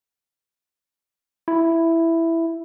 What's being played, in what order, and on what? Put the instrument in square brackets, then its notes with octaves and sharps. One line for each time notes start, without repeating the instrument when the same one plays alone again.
[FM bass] E4